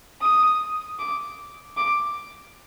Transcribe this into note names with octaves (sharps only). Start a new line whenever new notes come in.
D#6
D6
D6